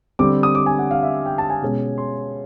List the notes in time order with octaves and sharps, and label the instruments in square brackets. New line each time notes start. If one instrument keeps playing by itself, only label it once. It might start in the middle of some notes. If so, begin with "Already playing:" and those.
[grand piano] D3 G3 C4 D6
D#6
D6
G#5
F#5
F5
E5
G5
A5
G#5
B2 G#3 C#4
C6